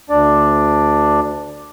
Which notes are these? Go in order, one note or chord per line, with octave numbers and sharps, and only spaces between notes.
D2 D4 D5